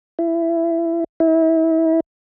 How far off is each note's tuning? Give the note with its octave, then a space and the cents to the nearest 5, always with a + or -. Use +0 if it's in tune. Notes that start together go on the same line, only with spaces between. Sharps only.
E4 +20
E4 -30